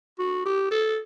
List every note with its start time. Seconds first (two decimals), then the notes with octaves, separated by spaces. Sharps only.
0.19 F#4
0.45 G4
0.71 A4